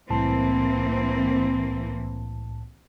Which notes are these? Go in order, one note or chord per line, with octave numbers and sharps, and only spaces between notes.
C2 A2 E3 A#3 C4 A5